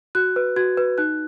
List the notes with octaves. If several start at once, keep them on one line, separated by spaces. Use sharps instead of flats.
F#4 F#6
B4
F#4 G#6
B4
D#4 F#6